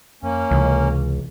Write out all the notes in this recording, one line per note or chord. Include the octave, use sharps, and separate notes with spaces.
F2 A#3 C#4
C#2 C3 E3